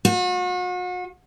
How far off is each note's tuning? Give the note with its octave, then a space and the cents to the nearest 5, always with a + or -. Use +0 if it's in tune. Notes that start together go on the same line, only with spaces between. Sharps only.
F#4 -40